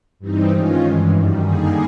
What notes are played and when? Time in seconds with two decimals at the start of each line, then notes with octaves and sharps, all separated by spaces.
0.19 G2 E3 G3 C4 D#4
0.50 D#3 G#3 C#4 F4
0.81 G2 E3 G#3
1.12 F#2 D#3 G3
1.43 D3 G3 A#3 D#4 G#4